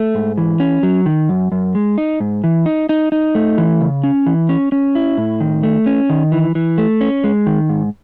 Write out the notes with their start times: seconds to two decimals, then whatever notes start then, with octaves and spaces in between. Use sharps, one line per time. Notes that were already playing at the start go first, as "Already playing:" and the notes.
Already playing: A3
0.15 G#2
0.38 E3
0.60 C#4
0.83 F#3
1.06 D#3
1.29 F#2
1.52 F#2
1.75 G#3
1.98 D#4
2.20 G#2
2.44 E3
2.66 D#4
2.89 D#4
3.12 D#4
3.35 A3
3.58 E3
3.80 C#3
4.04 C#4
4.26 E3
4.49 C#4
4.72 C#4
4.95 E4
5.18 A2
5.40 D#3
5.63 A3
5.86 C#4
6.10 D#3
6.32 E3
6.55 E3
6.78 A3
7.01 C#4
7.24 G#3
7.47 D#3
7.69 G#2